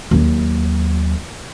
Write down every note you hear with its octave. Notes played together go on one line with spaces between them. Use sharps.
D#2 F#3